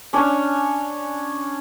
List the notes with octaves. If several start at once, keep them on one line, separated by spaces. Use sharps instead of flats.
C#4 D4 C#5